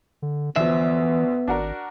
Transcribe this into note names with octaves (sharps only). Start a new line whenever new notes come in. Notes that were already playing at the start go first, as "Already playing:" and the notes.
D3
D2 E3 F3 B3 E5
G#1 D4 F#4 A#4